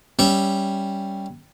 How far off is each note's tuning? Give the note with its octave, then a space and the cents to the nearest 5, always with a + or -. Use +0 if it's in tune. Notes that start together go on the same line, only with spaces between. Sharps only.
G3 +0 C#4 +0 E5 +0